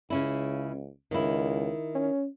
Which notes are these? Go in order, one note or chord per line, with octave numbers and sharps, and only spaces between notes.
C#2 C#3 C#4 E4
C#2 D#3 E4
C#4